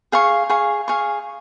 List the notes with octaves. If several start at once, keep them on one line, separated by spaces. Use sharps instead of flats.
G#4 F5 C#6
G#4 F5 C#6
G#4 F5 C#6